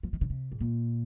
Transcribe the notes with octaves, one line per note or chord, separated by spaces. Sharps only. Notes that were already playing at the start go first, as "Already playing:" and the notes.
F3
D#3
C#3
C3
G#2
A#2